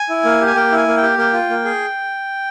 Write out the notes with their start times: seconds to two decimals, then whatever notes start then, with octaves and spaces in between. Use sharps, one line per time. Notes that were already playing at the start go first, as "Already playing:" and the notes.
Already playing: G#5
0.09 E4
0.25 A#3
0.41 G4
0.46 G#5
0.55 A#3 G5
0.72 E4 G#5
0.88 A#3
0.97 G5
1.03 G4
1.18 A#3 G5
1.33 F4
1.50 A#3
1.65 G#4